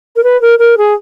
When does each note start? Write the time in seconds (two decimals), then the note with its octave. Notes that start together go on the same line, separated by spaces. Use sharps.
0.16 A#4
0.24 B4
0.41 A#4
0.59 A#4
0.78 G#4